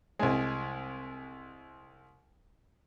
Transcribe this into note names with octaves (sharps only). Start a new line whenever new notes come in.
C2 G#3